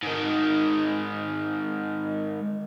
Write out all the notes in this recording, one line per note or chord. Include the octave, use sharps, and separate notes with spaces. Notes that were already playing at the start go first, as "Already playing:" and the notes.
G#2 D#3